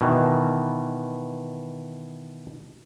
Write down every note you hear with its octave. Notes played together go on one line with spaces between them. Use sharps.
B2 D#3 E3